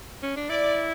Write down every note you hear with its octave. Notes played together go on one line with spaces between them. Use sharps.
C#4
D4
E4 D5